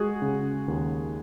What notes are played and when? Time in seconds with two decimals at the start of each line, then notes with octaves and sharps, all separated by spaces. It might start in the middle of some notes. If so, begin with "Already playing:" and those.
Already playing: G#3 F#4 G#4
0.22 C#3
0.68 D#2